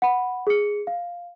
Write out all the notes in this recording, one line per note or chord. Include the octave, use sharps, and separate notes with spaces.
F#5 B5
G#4 C#7
F5